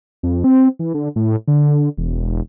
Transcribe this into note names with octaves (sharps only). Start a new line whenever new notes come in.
F2
C4
E3
D3
A2
D3
E1